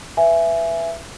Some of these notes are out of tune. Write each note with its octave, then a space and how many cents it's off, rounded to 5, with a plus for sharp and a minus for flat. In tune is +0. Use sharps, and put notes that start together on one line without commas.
B4 +0 E5 +15 G#5 +0